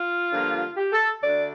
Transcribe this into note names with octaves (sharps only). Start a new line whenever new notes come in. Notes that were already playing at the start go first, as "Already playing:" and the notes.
Already playing: F4
G2 D3 F3 A#3
G4
A4
D2 D3 A3 D4 D5